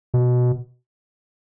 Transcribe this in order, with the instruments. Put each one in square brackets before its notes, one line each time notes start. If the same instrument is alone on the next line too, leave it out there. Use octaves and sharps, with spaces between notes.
[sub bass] B2